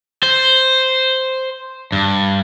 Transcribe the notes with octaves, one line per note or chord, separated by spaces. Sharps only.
C5
G2